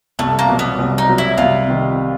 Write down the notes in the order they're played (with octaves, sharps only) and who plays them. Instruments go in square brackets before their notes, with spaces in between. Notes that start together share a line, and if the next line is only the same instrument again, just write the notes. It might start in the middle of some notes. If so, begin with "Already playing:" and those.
[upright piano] C2 [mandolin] A3
[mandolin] A#3
[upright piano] B2 F#3
[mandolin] B3
[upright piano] C2
[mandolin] D#4
[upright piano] B2 F#3
[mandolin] E4
[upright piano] C2 [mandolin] F4
[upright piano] C3 D#3